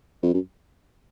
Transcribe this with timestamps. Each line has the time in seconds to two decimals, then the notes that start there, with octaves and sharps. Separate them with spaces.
0.23 F2
0.34 F#2